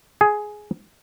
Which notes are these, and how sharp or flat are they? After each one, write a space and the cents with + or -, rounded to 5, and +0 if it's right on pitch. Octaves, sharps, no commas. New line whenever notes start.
G#4 +10